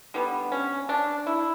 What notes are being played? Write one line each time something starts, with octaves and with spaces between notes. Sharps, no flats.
D3 G3 B3
C#4
D4
E4